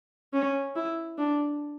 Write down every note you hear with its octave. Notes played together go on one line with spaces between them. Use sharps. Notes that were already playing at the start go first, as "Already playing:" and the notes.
C#4
E4
D4